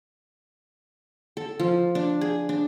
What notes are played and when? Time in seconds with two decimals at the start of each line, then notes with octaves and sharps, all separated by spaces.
1.37 A4
1.60 F3
1.95 D4
2.21 G#4
2.49 D4